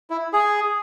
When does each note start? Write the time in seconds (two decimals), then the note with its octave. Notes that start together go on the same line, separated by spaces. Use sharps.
0.10 E4
0.33 G#4